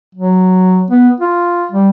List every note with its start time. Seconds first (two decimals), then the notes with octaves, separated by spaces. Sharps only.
0.15 F#3
0.91 B3
1.21 F4
1.72 G3